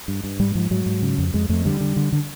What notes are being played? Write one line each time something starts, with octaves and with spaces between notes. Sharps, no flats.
G2
G2
G#2 G3
G#2 F3
G#2 F#3
G#2
C#3
F2
F2 G#3
F2 A3
D3 G3
D3
D3
D3